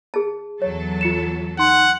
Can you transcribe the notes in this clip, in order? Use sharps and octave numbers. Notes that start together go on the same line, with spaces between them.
G#4 A5
E2 F#3 A4 C#5
F4 C#7 E7
D#4 F#5 C6